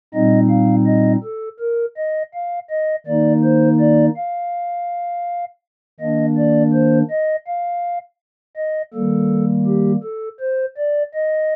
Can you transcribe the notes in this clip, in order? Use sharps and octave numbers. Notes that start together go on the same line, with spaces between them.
A#2 G3 C4 D#4 D#5
F5
D#5
A4
A#4
D#5
F5
D#5
D#3 A#3 D#4 D5
C5
D5
F5
D#3 A#3 D4 D#5
D5
C5
D#5
F5
D#5
D#3 G3 A#3 A4
G4
A4
C5
D5
D#5